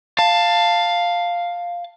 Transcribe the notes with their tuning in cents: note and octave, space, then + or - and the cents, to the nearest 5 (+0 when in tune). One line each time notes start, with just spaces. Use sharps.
F5 +0 A5 +15